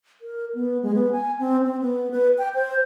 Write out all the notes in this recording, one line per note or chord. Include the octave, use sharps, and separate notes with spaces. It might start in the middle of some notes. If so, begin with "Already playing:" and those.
A#4
B3
G#3
B3
G#5
C4
C4
B3
B4
G5
C5